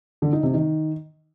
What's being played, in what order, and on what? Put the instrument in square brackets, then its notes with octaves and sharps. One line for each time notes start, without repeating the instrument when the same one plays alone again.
[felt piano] D3
D#4
C3
D#3